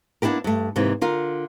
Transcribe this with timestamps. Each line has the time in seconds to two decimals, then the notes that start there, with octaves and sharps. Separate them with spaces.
0.22 A#3 B3 D4 E4 G4 A#4
0.44 G2 A3
0.76 G#2 C3 E3 A#3
1.01 D3 F4 A#4